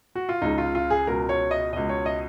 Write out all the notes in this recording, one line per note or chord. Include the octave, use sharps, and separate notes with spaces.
F#4
F4
C#2 C#3 D#4
F4
F4
G#4
C#2 B2 A#4
C#5
D#5
C#2 B2 D#5
C#5
D#5